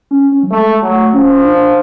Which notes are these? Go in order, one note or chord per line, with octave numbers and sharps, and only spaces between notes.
C#4
C#4
F#3
G#3 A3
F#3 A3
F3 C#4
D4